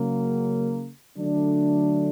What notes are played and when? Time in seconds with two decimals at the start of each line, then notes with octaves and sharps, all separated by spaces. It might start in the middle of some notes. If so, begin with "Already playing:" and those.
Already playing: C#3 F#3 A#3
1.17 D3 F#3 A3 D4